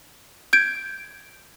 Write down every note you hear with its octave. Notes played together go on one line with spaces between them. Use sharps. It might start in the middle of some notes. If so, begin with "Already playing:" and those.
G6 G#6 D7